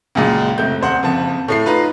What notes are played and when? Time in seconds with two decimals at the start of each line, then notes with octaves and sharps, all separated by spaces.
0.15 C#2 F#2 A#2 G#3
0.58 F1 A3 G6
0.81 D#1 C5 F#5
1.03 F#1 F2 A5
1.48 A2 A3 C7
1.66 D#4 F4 B4